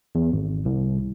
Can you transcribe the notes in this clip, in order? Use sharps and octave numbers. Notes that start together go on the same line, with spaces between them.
E2
G#1
C2